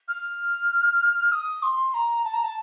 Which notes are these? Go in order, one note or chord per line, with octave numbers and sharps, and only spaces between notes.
F6
D#6
C6
A#5
A5
A#5
A5